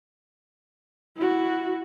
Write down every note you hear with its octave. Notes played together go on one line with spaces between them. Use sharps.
E4 F#4